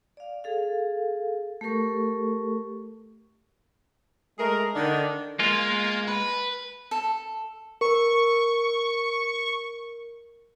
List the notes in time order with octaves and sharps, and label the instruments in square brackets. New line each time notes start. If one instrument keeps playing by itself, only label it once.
[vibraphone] D5 F5
G#4 A4 F5
A3 G4 A4 A#4 C#6
[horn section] G#3 A3 G#4 A#4
D3 D#3 D4
[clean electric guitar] G#3 F4 [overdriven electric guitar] A#3
[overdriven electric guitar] B4
[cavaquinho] A4
[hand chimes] A#4 [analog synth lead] C#6